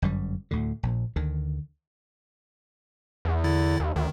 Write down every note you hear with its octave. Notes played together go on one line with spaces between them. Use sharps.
G1 F#2 G3
D2 A2 D3
A#1 A#2
D2 D3 D#3
E2
D3 E4 A6
D#2
D2 D#3